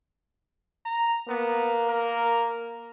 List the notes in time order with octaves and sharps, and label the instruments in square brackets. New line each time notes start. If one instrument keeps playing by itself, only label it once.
[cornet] A#5
[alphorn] A#3 [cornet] B3
[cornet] A#4